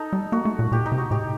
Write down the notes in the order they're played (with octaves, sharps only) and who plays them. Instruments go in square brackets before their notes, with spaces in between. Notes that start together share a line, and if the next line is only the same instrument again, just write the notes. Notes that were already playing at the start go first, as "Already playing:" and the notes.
Already playing: [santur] D#4 A4
[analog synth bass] G3
[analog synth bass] A#3 [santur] F#4
[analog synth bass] A3
A#2
[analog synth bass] A#2 [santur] G4
[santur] D#4
[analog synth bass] C3
[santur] F#4
[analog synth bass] A2 [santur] G4